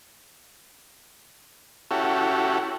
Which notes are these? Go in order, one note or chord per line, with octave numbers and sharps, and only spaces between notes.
C#4 E4 F#4 G4 A4